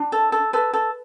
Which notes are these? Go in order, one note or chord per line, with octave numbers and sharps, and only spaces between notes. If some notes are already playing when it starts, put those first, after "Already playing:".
Already playing: D4
A4
A4
A4 B4
A4